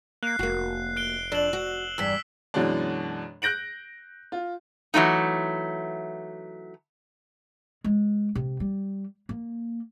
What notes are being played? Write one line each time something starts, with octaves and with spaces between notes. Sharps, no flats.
A#3 F#6 C7
F1 A#3 F#4
F#6 D7 G7
F2 D4 E6 E7 F#7
F#4
E2 G2 E6 B6
F#2 B2 E3 G#3 C#4 D4
F#6 G6 A#6 D7 F#7
F4
E3 F#3 G3 A3 D#4
G#3
C3
G3
A#3